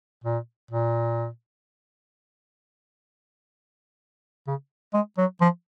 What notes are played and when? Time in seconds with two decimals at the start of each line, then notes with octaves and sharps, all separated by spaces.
0.24 A#2
0.71 A#2
4.47 C#3
4.94 G#3
5.18 F#3
5.41 F3